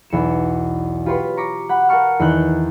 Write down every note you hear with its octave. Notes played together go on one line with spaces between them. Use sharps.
B1 E2 C#7 E7
F4 G4 B4 C#5 B5 C6
A#5 C#6 D6 A#6 B6
F#5 B5
A#4 F5 F#5 A5 C#6 F6
E2 D#3 D#4 F#6 G6